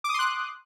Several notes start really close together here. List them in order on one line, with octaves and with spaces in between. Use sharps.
D6 D#6 C6 F#6